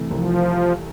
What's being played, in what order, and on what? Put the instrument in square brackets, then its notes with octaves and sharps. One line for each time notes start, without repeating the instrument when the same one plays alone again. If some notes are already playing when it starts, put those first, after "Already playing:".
Already playing: [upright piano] C3 E3 A3
[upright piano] C2 [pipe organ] F3